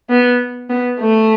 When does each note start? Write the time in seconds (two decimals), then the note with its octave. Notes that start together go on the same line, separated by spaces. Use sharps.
0.10 B3
0.70 B3
1.00 A3